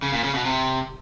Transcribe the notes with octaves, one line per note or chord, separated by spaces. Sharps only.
C#3
A#2
C#3
B2
C3